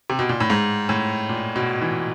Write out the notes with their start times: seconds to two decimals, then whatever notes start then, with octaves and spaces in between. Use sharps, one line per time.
0.10 C3
0.19 B2
0.29 A#2
0.40 A2
0.50 G#2
0.89 A2
1.29 A#2
1.56 B2
1.82 E3